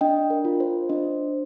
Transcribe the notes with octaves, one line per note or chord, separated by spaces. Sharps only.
D4 D#5 G5
A#4
F4
C5
D4 C5 D#5